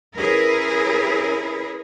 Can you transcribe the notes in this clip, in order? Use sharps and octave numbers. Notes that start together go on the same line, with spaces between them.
C#4 E4 G#4 A#4 B4